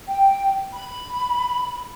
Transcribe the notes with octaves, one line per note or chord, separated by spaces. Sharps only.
G5
B5